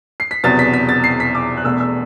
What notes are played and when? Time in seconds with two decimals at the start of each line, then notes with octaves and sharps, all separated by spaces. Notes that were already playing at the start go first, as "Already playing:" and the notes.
0.20 C7
0.31 B6
0.44 E1 E2 C3 F#3 B3 A6
0.59 B6
0.73 B6
0.89 A6
1.04 C7
1.20 B6
1.35 D6
1.57 F#6
1.64 E1 E2 B2 A3 E6
1.80 E6